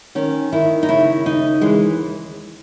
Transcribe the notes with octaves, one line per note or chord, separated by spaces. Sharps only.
D#3 C#4
D#3 E4
D#4
C#3 E4
D#2 D#4
E3 G#3